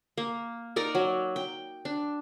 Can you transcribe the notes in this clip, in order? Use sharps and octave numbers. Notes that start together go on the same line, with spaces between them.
A#3
D#4 A#4 D5 A#5
F#3
G5
D4